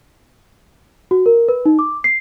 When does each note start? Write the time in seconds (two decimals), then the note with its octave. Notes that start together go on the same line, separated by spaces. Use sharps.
1.11 F#4
1.26 A#4
1.48 B4
1.66 D#4
1.79 D6
2.04 C7